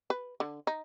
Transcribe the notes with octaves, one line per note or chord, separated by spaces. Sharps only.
B4
D3
D#4